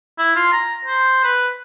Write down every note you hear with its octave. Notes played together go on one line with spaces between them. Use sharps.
E4
F4
A#5
C5
B4